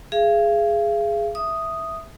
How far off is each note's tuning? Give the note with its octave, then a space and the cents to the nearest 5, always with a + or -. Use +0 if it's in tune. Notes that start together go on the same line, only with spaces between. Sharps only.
G#4 +0 F5 -40
E5 +0 D#6 +0